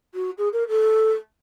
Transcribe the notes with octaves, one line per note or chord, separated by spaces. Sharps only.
F#4
G#4
A#4
A4